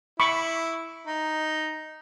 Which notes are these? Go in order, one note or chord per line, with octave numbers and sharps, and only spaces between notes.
E4 B5 C#6 D6
D#4